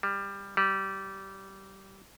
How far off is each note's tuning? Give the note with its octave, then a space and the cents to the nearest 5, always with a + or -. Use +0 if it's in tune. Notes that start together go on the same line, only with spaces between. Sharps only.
G3 +15
G3 -20